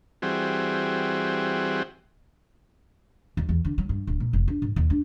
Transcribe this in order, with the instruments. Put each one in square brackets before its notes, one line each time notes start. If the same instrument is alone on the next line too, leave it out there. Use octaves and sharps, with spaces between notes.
[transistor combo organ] E3 G3 C4 F#4 G#4
[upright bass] D#2
E2
D3
F#3
G2
D1
A#2
F1
D4
G#2
D#2
D4